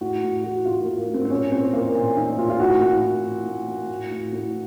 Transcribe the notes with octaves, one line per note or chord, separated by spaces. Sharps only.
A2 F#4
A2 F#4
A2 F#4
A2 F4
A#3
A2
A#3
A2
C4
C4
A#2 C#4
A#2 C4
A#2 A#3
A#2
A#2 D#4
A#2 F4
F4
A2 F#4
A2
A2
A2
A2
A2
A2
A2
A2